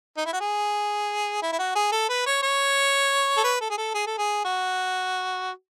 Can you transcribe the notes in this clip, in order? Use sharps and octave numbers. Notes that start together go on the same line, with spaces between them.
D#4
E4
F#4
G#4
E4
E4
F#4
G#4
A4
B4
C#5
C#5
A4
B4
A4
G#4
A4
G#4
A4
G#4
F#4